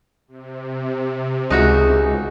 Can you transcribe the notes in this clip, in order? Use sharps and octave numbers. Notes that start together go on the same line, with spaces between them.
C3
C#2 D#4 F#4 G#4 E5